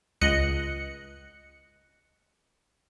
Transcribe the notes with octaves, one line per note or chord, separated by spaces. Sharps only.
C#2 D#5 F#6 C#7